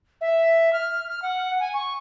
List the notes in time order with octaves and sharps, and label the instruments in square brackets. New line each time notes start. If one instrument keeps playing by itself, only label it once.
[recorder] E5
F6
F6
F#5
G#5
C#6